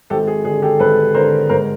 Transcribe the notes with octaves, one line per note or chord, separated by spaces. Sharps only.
G#1 G4 A4
G#4
D3 G#4
G4 A4
G#1 A4 B4
D3 A#4 C5
G#2 A#4 C5